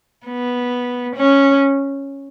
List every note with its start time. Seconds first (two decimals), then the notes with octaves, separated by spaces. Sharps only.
0.27 B3
1.15 C#4